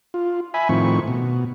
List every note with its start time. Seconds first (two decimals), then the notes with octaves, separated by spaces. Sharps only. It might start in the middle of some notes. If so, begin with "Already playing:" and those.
0.14 F4
0.54 E5 G#5 B5
0.69 A2 D#3 F3 C4 C#6
1.08 B2